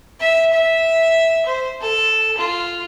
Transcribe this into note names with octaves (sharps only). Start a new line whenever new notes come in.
E5
E5
C5
A4
F4